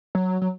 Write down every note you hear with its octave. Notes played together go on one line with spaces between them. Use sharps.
F#3
F#3